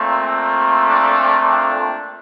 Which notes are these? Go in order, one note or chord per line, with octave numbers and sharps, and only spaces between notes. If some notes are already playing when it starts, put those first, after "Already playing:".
Already playing: A#2 A3 C4
D4
D4